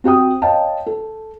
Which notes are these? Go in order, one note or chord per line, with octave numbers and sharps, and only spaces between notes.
C4 F#4 G5 D#6
C#5 D#5 F5 G5 A5
A4